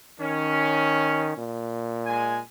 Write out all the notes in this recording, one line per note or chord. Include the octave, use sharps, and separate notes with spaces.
D#3 C#4
A#2
G#3 G#5